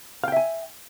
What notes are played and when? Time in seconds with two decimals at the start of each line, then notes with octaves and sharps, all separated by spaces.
0.24 F5
0.28 G5
0.32 E5
0.37 G#5